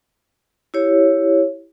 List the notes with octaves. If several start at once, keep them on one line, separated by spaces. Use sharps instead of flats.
E4 G4 C#5